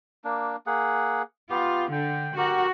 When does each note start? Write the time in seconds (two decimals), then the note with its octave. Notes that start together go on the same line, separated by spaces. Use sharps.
0.25 A#3 D4
0.67 A#3 G#4 F#5
1.50 B3 F4 G4
1.92 D3 G5
2.37 F#4 G4 A#4